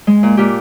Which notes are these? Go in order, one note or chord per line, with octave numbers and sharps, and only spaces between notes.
G#3
A#2
A#2 G4